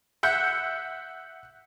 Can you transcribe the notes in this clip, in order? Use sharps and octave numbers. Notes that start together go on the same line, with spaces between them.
E5 F#5 G6